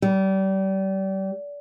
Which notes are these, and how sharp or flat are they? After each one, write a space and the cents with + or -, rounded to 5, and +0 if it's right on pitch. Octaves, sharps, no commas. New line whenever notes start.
G3 -30